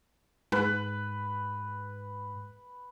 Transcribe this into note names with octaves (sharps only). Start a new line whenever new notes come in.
G#2 B4